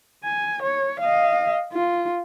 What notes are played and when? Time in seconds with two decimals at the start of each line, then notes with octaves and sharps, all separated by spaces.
0.24 G#5
0.62 C#5
1.00 D#5 F5
1.73 F4